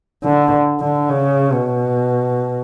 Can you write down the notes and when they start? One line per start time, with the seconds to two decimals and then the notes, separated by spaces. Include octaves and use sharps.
0.24 D3
0.81 D3
1.10 C#3
1.52 B2